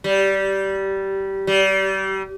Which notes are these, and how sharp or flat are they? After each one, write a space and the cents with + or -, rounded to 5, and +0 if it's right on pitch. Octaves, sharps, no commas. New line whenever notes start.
G3 -15
G3 -30